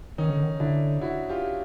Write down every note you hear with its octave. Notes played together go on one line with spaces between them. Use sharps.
D#3 C#4 D#4
D3
D#3
D3 D4 E4
E4 F#4
F4 G4